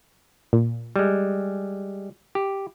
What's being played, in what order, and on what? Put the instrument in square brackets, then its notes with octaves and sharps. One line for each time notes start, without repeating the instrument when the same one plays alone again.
[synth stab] A#2
[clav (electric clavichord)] G3 G#3
G4